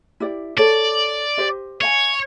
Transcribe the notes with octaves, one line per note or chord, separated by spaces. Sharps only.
E4 G4 D5
A4 C#5 D5
G4 C5 D#5
C#5 D#5 F5 G#5